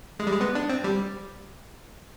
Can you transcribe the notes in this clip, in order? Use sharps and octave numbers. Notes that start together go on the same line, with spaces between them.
G#3
G3
G#3
B3
D4
C4
G3